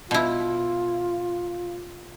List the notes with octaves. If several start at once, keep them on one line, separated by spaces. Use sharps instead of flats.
B2 E4 F4